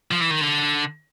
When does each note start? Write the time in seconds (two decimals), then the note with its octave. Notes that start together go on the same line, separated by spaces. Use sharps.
0.11 F3
0.21 E3
0.31 D#3
0.41 D3